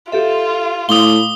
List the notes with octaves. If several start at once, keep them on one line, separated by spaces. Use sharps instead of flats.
F4 G4 A4 E5
A2 F5 C6 D6 D#6 G7